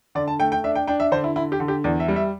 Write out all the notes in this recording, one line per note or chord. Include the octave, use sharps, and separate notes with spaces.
D3 D5
A5
A3 G5
G5
D4 E5
G5
D4 G5
E5
D3 C5
E4
D3 E4
G4
D3
G4
E2 D5
E5
G3
E5